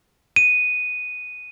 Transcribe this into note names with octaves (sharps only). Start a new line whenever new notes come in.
D#7